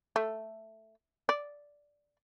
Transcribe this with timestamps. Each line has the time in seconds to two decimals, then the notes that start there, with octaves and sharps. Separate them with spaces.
0.16 A3
1.29 D5